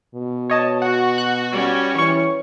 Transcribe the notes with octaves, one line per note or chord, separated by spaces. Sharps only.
B2
C#5 D#5 A5
F#4 F#5
F#6
G3 C#4
E3 C#5 C#6